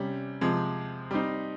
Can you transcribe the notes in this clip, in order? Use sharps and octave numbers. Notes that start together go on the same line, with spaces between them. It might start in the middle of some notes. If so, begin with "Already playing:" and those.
Already playing: C3 G3 C#4
C3 F3 G#3
G3 C4 D#4